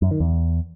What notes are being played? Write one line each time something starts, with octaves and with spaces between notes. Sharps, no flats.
F#2
D#3
E2